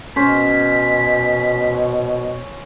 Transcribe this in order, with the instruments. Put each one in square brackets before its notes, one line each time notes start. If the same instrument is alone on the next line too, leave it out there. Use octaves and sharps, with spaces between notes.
[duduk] B2 [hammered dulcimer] C#4 C5 [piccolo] B6